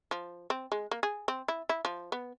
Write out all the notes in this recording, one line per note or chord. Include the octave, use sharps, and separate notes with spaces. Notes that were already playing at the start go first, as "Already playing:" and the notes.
F3
C4
G#3
A#3
G#4
C4
E4
E4
F3
B3